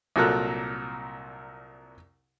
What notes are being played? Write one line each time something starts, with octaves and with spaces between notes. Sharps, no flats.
C2 A#2 F#3 A4 A#4 F#6